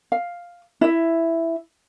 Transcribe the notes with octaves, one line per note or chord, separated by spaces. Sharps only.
F5
E4 E5